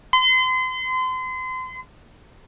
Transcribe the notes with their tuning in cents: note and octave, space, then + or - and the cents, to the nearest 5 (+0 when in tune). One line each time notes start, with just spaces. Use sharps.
C6 -35